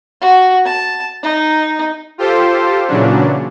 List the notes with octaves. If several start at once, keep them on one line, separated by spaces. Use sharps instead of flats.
F#4
A5
D#4
F4 G4 A4 C5
A#2 C#3 E3 F#3 C#4 D4